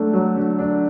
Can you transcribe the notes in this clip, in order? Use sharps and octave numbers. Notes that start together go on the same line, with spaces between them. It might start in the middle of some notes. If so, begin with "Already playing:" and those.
Already playing: F#3 A3 D4
F#3
D3
D4